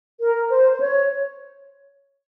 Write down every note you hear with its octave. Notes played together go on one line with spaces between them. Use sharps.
A#4
C5
C5
C#5